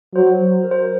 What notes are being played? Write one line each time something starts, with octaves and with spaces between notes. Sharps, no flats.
F#3 C5
A#4
C5